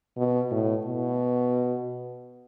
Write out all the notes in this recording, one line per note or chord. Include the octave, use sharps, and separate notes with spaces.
B2
A2
B2